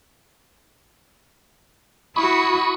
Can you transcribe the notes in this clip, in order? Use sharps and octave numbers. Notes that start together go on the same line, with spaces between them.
E4 F#4 B5 C#6 D#6